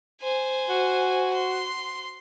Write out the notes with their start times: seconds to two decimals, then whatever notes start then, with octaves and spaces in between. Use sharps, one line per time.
0.22 C5 G#5
0.70 F#4
1.34 C6